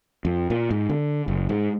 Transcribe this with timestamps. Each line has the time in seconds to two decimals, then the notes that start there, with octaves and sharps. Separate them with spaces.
0.25 F2
0.50 A#2
0.71 G#2
0.89 D3
1.28 F#1
1.49 G#2